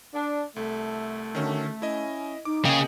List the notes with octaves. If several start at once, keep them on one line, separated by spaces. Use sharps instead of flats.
D4
C2 A3
D3 D#3 C#4 F#4
C#4 E4 D#5
D#4 D6
C#3 A#3 C#4 G#4 D#5 G5